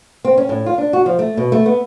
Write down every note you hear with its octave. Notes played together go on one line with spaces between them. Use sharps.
C4
C#4
A2
F4
D4
F#4
F3
A3
B2
A3
B3